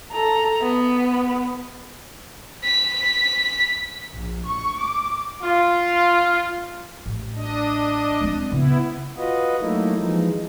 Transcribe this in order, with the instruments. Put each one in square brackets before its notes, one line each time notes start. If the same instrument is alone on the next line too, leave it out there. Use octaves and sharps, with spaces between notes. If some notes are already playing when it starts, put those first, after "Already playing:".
[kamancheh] A4 A#5
B3
[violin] B6
[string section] A#1
C#6
D6
[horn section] F4
[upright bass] A1
[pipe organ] D4 D#5
[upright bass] G#3 C4
[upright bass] C#3 [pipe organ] B3 E4
[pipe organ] F4 F#4 B4 D#5
F#3 A3 A#3 D#4 E4
E3 F3 G#3 D#4